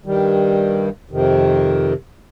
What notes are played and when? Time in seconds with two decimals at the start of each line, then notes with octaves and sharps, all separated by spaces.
0.06 G2 D#3 G3
1.10 F2 C3 D#3